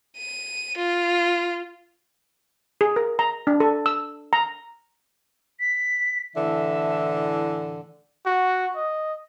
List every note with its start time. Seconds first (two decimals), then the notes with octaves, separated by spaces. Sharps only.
0.18 D#7
0.77 F4
2.81 G#4
2.96 A#4
3.19 A#5
3.47 D4
3.60 A4
3.86 E6
4.33 A#5
5.60 B6
6.35 A2 D3 E3 E5
8.26 F#4
8.76 D#5